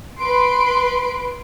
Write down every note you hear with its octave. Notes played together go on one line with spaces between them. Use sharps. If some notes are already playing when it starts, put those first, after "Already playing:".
B4 C6 D7